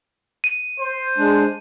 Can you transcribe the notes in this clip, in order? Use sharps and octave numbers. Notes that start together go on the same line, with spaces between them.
D#7
C5
G#3 D4